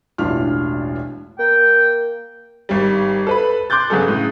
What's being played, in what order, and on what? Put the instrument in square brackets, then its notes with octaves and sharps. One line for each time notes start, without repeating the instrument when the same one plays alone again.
[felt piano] E1 A1 E3 D4 F4 F6
[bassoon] A#3 [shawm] G5
[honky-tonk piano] G#1 G3
A4 B4 B5
C6 D6 F#6 G6 A6
G1 C#3 F#3 G#4 A4
A2 C#3